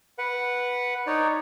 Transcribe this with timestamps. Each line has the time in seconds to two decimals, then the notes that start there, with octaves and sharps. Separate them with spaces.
0.18 B4 F#5
1.07 D#4 C#5 D5